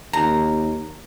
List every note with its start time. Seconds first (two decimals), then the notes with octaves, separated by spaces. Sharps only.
0.13 D#2 A#5